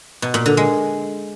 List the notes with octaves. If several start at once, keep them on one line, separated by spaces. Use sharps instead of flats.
B2
A#2
D3
G#3